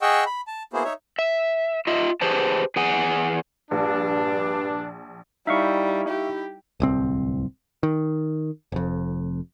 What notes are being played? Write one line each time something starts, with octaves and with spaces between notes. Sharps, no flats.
G#4 D#5 F#5 G5 C#6 E6
B5
A5
A#3 B3 E4 F#4 G#4 C5
D#4 C#5 E5
E5
F4 D#5 E5
G4 G#4 B4 C5 A5
E2 G#4 F#5 G#5
A#1 G2 D4
G3 D#4 E4 E5 F5 C#6
G4
D1 C2 C4
D#3
F1 F2